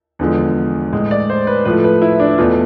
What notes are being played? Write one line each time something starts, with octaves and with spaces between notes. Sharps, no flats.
E2 D3 F3 G#3
A2 G#3
D5
C5
B4
A2 F3 A3 B4
B4
E4
D4
E2 B2 A3 F4